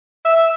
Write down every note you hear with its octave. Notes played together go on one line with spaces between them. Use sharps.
E5